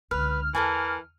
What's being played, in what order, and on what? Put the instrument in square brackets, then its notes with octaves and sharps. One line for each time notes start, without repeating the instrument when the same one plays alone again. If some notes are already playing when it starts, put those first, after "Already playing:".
[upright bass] C#2 D3 [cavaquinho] B4 [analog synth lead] F6
[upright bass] E2 [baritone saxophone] E3 [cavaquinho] A4 A#4 G#5